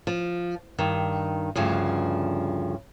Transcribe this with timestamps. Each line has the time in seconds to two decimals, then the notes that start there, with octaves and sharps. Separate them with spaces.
0.07 F3
0.78 G2 D#3
1.56 D2 G2 C#3 F3